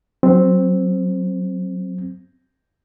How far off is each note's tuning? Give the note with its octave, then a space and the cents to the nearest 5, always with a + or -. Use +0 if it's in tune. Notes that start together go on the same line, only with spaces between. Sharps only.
F#3 +0 C4 +0